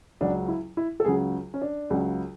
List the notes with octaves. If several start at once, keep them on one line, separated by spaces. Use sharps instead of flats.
C#2 C#3 F#3 D4
E4
E4
A4
C#2 C#3 F#3 G#4
C#4
D4
C#2 C#3 F#3